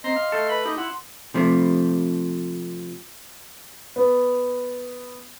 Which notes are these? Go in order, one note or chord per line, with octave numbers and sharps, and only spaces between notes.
C4 D#5 A#5 C6
F5
A3 A4
B4 B5
D#4 G4
E4 F#5 C6
C3 F3 A3
B3